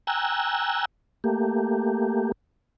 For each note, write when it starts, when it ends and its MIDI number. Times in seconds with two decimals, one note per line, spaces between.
0.07 0.85 79
0.07 0.85 80
0.07 0.85 82
0.07 0.85 88
0.07 0.85 90
1.24 2.32 57
1.24 2.32 58
1.24 2.32 67